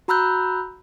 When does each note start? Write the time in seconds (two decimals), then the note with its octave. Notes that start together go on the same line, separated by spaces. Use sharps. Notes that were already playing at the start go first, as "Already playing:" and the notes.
0.08 F#4 A#5 B5 E6 F#6 G6